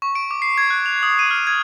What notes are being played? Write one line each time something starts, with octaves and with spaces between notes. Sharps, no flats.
C#6
D7
D6
C7
G#6
F#6
F7
D#6
D#7
F6
G#6